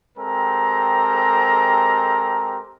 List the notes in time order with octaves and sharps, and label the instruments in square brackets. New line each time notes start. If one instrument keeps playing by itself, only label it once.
[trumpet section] G#3 C4 G4 A4 A#4 A#5